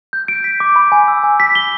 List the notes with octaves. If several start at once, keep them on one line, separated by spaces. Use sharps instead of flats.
G6
D7
B6
D6
B5
G#5
E6
G#5
B6
G7